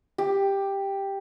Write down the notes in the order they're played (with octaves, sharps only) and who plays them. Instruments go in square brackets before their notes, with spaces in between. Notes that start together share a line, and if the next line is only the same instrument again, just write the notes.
[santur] G4